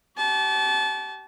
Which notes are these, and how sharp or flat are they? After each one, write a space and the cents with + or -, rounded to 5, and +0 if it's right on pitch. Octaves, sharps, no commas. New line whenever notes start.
G4 -35 A5 -30